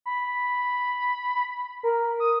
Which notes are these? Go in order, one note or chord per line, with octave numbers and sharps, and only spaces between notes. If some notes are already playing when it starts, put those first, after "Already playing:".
B5
A#4
D#6